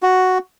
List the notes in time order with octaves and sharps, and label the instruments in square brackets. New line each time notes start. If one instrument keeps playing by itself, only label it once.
[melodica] F#4